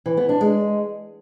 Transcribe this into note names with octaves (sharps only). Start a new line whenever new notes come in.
E3
B3
D4
G#3